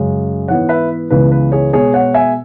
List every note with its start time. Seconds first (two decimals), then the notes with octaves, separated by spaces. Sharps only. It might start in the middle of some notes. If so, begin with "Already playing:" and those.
Already playing: F#2 C#3 G#3
0.48 G#2 E3 B3 C#5 F#5
0.69 B4 E5
1.10 C#2 C#3 E3 G#3 B3 B4
1.32 B4
1.52 G#4 C#5
1.73 B2 G#3 B3 G#4 C#5
1.94 C#5 F#5
2.14 E5 G#5